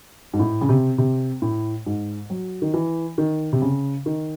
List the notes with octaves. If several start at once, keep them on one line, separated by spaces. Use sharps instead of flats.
G#2
A2
C#3
C3
C3
A2
G#2
F#3
D#3
E3
D#3
C3
C#3
D#3